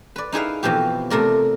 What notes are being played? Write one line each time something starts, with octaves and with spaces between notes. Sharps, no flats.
B4 D5
D#4 E4 G#4 B4 F5
F2 B2 E3 F3 G4
C3 A3 A#4 D5